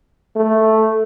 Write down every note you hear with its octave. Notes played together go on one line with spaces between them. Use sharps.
A3